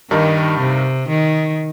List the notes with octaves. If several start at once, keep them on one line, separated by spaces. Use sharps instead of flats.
G2 D#3 G3 D#4 A#4
C3
D#3